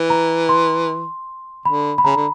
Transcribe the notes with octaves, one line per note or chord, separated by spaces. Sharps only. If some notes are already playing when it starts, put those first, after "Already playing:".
Already playing: E3
A#5
C6
D3 B5
B5
C#3 A#5
D3